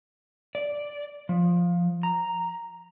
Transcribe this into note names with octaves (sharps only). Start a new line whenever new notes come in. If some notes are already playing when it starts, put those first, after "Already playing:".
D5
F3
A#5